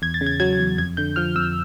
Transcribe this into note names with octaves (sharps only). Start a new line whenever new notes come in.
E2 G#6
A6
C#3
G#6
F#3 G#6
E2
F2 G#6
D3 G6
F3 F6
F2 E6